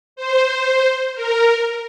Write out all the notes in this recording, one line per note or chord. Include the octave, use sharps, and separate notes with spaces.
C5
A#4